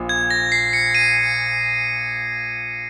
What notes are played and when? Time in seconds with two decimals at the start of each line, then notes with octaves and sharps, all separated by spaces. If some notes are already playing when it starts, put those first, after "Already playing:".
Already playing: A#1 A#2
0.09 G#6
0.31 A#6
0.52 C7
0.73 C#7
0.95 D#7